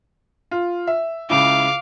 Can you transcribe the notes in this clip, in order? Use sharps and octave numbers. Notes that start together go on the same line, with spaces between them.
F4
E5
C#2 C#3 E4 F5 D6